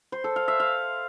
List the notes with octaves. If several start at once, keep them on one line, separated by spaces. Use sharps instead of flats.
C5
A4
F5
E5
F5